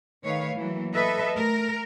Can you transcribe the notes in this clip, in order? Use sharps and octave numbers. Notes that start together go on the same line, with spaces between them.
D#3 A3 B4 C#5 F5
E3 F#3 A#3
A4 B4 D#5 E5
A3 A#4